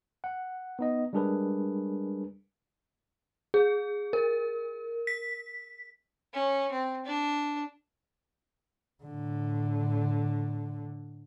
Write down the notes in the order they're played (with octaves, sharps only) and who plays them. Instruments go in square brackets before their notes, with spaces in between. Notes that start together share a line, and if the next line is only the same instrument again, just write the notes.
[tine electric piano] F#5
B3 D#4 D#5
G3 G#3 D4 G#4 A#4 B4
[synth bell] G#4
A#4
B6
[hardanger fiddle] C#4
C4
D4
[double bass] A2 D3